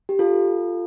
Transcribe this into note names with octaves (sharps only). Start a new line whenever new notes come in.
G4
F4 A4